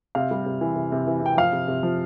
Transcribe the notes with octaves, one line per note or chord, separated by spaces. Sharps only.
C3 F5
G3
C3
E3
C3
C3
E3
C3 G5
F3 F5
C3
C3
F3